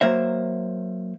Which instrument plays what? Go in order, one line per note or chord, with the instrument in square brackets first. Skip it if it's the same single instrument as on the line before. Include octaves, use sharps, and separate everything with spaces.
[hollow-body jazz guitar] F#3 A#3 C5 E5